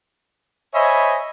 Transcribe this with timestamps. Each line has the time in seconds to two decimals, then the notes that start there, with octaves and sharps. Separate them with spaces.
0.73 C5 C#5 D#5 E5 G#5 B5